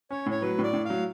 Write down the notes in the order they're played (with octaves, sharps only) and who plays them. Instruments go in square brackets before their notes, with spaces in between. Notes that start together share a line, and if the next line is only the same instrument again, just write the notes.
[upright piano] C#4 [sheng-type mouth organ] C#5
[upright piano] A2 [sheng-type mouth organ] C#5
[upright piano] F#3 [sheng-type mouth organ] B4
[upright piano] A2 [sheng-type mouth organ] D5
[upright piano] A2
[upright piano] F#3 [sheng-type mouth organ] F5